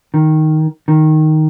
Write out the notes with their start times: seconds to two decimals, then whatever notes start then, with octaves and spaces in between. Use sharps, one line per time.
0.14 D#3
0.88 D#3